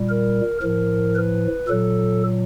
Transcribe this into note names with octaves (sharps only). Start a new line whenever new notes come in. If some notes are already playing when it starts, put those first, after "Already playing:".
Already playing: A#2 G3
A#4
A2 F3 A#4
B4
A#2 F#3 A4